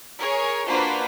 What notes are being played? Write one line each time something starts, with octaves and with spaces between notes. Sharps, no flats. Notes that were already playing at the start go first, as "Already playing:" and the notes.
G#4 A#4 C#5
A#3 D4 F4 F#4 B4 C5